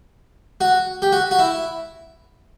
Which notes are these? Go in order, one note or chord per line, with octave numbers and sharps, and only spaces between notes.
F#4
G4
F#4
F#4
E4